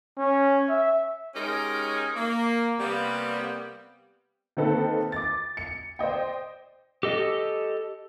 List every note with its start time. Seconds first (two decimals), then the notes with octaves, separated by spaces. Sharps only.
0.18 C#4
0.69 E5
1.35 G#3 C#4 D#4 G4 A#4
2.15 A#3
2.80 C3 G3 A#3 B3
4.57 D#3 A#3 C4 D#4 A4 B4
5.12 D6 A6
5.57 C#7
5.99 C5 D5 D#5 G5
7.03 G4 A4 D#5